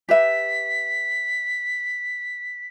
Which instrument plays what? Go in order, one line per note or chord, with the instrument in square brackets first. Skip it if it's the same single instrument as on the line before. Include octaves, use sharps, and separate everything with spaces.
[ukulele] G4 B4 E5 [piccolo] B6